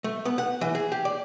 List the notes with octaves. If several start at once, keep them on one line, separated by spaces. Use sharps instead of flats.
A3
B3
F#5
E3
G#4
G4
D5